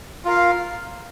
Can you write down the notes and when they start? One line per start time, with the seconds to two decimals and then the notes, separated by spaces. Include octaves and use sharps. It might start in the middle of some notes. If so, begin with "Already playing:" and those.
0.25 F4 A#4 F5